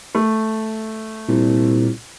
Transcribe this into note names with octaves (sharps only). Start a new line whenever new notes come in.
A3
C2 A#2